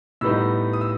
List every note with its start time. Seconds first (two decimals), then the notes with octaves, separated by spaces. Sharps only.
0.21 A2 G3 B3 D#4 E6
0.73 D#6
0.81 E6